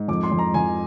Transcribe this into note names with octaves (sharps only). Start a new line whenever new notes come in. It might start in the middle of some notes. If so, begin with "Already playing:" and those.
Already playing: G#2
F2 D6
C6
F2
A#5
F2 G#5